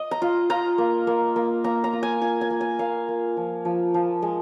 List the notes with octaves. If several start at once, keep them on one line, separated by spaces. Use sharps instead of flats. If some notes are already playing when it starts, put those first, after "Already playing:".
Already playing: D#5
A#5
F4
F4 A#5
A#3
A#3
A#3
A#3 A#5
A#5
F4
G#5
F4 G#5
G#5
A#3
G#5
A#3 F5
A#3
F3
F3
F3
G#3